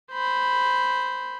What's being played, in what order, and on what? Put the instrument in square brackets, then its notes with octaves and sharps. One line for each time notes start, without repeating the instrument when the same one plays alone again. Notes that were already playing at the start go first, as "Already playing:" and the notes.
[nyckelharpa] C5 B5